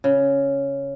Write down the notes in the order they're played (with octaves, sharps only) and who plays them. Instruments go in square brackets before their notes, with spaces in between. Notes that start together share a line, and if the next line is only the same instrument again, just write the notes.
[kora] C#3